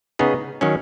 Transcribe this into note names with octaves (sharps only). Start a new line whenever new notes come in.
C#3 B3 D#4 G#4
D#3 F#3 C#4